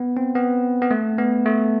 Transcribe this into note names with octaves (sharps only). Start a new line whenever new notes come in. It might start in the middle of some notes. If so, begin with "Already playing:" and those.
Already playing: B3
C4
B3
B3
A3
B3
A3